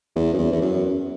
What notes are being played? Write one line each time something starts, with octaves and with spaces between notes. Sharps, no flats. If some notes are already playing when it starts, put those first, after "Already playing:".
E2
F#2
E2
E2
F#2